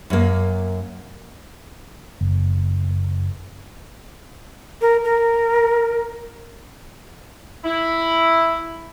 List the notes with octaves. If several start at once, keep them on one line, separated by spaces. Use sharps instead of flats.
F#2 A#3
F#1
A#4
A#4
E4